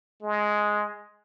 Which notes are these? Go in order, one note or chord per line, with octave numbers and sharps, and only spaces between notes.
G#3